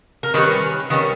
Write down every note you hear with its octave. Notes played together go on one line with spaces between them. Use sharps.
A#4
D#3 G3 C#4 B4
D#3 G3 C#4